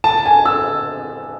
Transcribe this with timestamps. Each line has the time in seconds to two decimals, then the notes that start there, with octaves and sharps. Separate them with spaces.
0.04 A5
0.26 G#5
0.46 E6